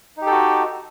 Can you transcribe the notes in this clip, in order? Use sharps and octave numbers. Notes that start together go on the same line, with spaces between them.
D#4 F#4 G4 A4